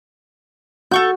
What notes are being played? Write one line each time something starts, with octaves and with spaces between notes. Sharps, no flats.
F#4 A4 C#6 G6